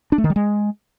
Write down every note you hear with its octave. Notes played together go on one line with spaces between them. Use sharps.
D4
A3
D#3
G3
G#3